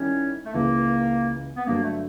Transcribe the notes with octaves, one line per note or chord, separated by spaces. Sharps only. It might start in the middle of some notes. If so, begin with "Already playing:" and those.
Already playing: D#3 G3 C#4 E4
A3
C#2 C#3 E3 A#3
B3
G2 D3 F#3 A#3
A3